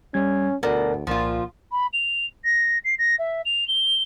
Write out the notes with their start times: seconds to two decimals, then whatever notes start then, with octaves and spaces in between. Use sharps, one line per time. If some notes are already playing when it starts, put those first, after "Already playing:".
0.14 G3 C#4 G#6
0.63 D2 B2 A4 A#4 D5
1.07 C2 A#2 F3 F4
1.72 B5
1.93 F7
2.44 A#6
2.84 C7
2.99 A#6
3.19 E5
3.45 F7
3.68 G7